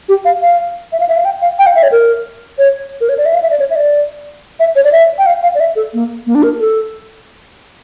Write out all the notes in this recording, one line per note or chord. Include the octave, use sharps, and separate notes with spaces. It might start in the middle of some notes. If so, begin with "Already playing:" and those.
G4
F5
F5
E5
F5
E5
F5
G5
F5
G5
F5
E5
C#5
A#4
C#5
A#4
C#5
D5
E5
F5
E5
D5
C#5
E5
D5
E5
C#5
D5
E5
G5
F5
F5
D5
E5
A4
A#3
A#3
D4
A#4
A4